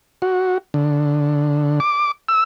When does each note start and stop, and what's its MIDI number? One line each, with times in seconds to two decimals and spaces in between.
0.22 0.58 66
0.74 1.80 50
1.80 2.11 86
2.29 2.44 88